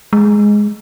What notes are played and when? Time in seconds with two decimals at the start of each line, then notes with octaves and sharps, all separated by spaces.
0.13 G#3